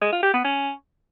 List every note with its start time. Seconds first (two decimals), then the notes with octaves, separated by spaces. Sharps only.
0.01 G#3
0.12 F4
0.23 G4
0.34 B3
0.44 C#4